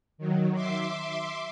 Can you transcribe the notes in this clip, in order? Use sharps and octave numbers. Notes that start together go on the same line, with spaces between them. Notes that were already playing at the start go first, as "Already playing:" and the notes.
D#3 F#3
E5 C6 D6